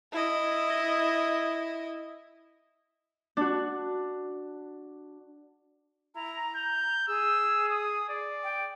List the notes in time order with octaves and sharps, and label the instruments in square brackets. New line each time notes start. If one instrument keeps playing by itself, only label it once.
[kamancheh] E4 D#5
[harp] D4 F#4
[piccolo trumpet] E4 [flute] A#5
[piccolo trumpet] G6
[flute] G#4 [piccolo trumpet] E6
[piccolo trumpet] D#6
D5
[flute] G5